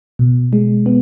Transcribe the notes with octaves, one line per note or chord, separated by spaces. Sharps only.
B2
G#3
B3